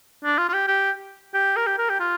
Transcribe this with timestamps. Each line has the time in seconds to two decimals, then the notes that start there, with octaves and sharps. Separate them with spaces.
0.24 D4
0.38 F4
0.49 F4
0.53 G4
0.68 G4
1.34 G4
1.56 A#4
1.67 G4
1.78 A#4
1.90 G4
2.00 F4